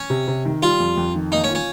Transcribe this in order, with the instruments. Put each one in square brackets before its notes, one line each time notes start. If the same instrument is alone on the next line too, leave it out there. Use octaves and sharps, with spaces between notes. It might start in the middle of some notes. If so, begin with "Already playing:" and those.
Already playing: [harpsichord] C#4
[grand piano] C3
C3
D#3
[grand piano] G3 [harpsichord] F4
[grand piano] F2
F2
D#3
[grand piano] A#3 [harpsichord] D#4
[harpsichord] C#4
[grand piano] F4
[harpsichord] C#4